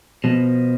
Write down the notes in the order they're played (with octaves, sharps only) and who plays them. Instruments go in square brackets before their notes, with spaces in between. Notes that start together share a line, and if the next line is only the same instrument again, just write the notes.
[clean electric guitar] B2 [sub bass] F3